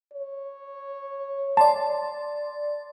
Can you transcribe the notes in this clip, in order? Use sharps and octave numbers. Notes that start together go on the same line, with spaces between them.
C#5
D5 A5 C6 A6